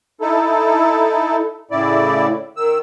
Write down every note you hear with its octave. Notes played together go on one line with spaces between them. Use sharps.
D#4 E4 A4
A2 C#3 E4 D5
D#3 E6